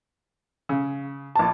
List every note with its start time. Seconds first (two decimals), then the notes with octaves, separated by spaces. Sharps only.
0.69 C#3
1.35 A#1 A5